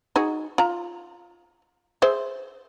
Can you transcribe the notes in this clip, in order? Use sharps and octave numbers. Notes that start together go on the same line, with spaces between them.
D#4 F#4 G#4
F4 A#5
G#4 C5 E5